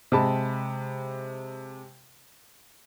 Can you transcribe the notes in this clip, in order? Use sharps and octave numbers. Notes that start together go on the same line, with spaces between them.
C3 G#3 A5 B5